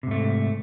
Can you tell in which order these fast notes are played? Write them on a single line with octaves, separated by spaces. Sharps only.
C3 G#2 A3